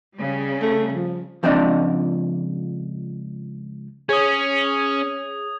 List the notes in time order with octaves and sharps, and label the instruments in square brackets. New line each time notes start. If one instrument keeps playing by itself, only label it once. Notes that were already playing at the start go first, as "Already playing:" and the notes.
[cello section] C#3 G3
[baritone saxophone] A3
F3
[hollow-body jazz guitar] C#2 F3 C4 D4 D5 D#5
[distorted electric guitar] C#4 [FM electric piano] G#4 C#5 [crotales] D#6 G#6